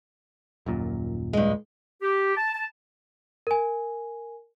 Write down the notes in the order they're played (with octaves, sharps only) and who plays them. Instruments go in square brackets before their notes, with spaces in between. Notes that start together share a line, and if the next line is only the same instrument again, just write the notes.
[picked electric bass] D#1 F#2 A#2
[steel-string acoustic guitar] G2 G#3
[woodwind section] G4
A5
A5
[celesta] A#4 G#5